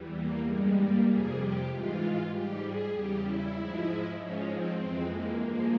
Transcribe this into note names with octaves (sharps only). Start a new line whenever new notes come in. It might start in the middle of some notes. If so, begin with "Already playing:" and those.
Already playing: E2 E3 G3
A#3
G2 G3 G#3
A#3
F2 C3 G3 G#4
G4
G#2 E3 G#3 F4
G#2 G3 G4
G#4
E2 C#3 G3 G4
E4
G#2 F3 G#3
G#2 F3 G#3 C#4
C4
F2 E3 G#3
A#3
G2 F3 G#3 A#3